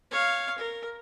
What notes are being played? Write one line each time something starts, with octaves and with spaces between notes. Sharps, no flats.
C#5 F5
A#4